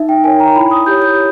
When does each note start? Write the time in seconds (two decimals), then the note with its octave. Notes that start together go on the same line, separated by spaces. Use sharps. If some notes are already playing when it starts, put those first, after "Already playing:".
Already playing: D#4 E5
0.09 G5
0.24 A#4 C#5 G#5
0.40 A#5
0.56 E4 B5
0.71 D#6
0.86 G4 C#5 G6
1.02 G6